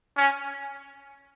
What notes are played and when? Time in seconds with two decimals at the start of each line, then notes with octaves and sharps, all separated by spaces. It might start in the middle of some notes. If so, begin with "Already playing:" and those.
0.17 C#4